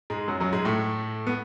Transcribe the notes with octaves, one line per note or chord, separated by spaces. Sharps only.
G#2 G#3
F#2 F#3
F#2 F#3
G#2 G#3
A2 A3
B3